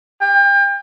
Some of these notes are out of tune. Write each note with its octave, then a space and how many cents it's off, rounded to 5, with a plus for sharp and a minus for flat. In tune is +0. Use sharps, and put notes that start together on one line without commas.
G5 +35